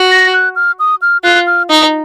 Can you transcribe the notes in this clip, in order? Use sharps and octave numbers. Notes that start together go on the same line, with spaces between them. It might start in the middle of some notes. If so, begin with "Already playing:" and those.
Already playing: F#4
A#6
F#6
F6
D#6
F6
F4 F#6
F6
D#4 D#6